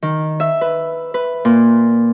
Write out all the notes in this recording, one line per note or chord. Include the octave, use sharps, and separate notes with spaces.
D#3
E5
B4
B4
A#2